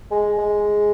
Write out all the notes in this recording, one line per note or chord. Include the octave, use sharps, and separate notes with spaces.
G#3
G#3